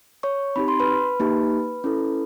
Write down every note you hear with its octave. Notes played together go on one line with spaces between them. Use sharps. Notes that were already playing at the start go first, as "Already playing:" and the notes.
C#5 C#6
C4 D#4 G4 B5
C6
B4 B5
A#3 D#4 G4
C#4 E4 A4